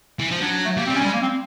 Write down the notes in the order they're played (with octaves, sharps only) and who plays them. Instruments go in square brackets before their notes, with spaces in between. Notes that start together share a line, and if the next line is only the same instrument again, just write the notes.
[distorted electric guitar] E3
F3
[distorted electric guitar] F#3 [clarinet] D4
[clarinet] D4
A3
[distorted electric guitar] G3 [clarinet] A#3
[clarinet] C4
[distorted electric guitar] G3
[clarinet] C#4
[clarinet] G3 [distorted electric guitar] G#3
[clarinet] A#3
C4